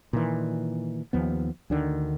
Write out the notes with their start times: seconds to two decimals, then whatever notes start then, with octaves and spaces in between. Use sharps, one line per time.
0.13 A#2 D#3 E3
1.13 D#2 F3 B3
1.70 D2 D3 D#3